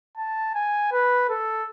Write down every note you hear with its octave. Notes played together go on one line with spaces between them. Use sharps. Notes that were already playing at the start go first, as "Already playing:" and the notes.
A5
G#5
B4
A4